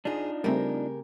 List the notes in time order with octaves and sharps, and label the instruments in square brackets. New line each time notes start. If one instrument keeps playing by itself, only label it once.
[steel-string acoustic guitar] F2 G#4 [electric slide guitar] D4 D#4 F4
[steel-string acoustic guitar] C#3 G4 A#4 [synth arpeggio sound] G3 A3 C4